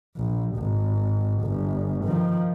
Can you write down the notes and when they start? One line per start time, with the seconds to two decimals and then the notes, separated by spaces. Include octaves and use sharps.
0.17 A#1
0.57 G#1
1.43 G1
2.05 D#3 F3